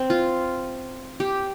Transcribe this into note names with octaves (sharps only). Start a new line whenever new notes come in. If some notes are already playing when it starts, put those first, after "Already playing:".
Already playing: C4
F4
G4